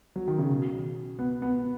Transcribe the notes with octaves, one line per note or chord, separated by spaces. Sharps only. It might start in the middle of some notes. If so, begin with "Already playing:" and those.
F#3
D#3
C#3
B2
B3
B3